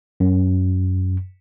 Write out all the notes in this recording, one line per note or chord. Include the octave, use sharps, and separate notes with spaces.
F#2